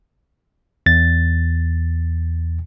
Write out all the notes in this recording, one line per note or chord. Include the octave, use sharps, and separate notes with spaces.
E2 A6